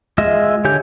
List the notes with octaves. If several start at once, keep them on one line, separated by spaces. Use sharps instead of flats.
G#3 F4 D#5 E5
D3 G4 C#5 G#5 G6